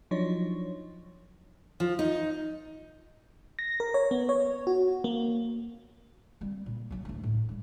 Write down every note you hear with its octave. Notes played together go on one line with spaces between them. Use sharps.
F3 F#3 D4 D#4 C#5
F3
D#4
A#6
A#4
C#5
B3
C#5
F#4
A#3
G3 C4
A#2
F#3 D#4
A1 D2
A2
G2 G3